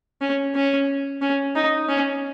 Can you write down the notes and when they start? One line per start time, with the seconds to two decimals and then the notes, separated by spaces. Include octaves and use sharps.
0.21 C#4
0.55 C#4
1.22 C#4
1.55 D#4
1.89 C#4